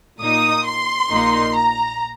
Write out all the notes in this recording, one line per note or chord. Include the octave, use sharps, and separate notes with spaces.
A#2 A#3 D#4 D#6
C6
A#1 A#2 A#3 D#4
A#5